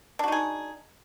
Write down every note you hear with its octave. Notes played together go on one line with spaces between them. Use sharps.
D4 D#4 F#4 G#4